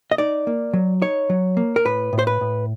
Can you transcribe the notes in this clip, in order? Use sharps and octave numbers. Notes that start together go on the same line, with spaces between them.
D#5
D#4 D5
A#3
F#3
D#4 C#5
F#3
A#3
A#4
A2 B4
A2
C5
B4
A2